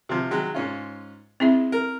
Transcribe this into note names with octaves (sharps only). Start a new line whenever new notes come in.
C3 F3
D#3 F#3 G#3
G#2 C#4 F4
G#3 C4 E4 E5
A#4